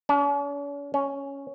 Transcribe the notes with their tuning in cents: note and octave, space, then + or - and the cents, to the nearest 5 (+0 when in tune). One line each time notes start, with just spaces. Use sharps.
C#4 +45
C#4 +0